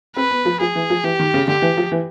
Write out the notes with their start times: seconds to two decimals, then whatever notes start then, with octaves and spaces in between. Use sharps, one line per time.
0.16 C4 B4
0.31 B3
0.45 F3
0.60 F3 G#4
0.75 E3
0.90 F3
1.04 E3 G4
1.19 D#3
1.34 C#3
1.48 D3 G4
1.62 E3
1.77 F3
1.92 E3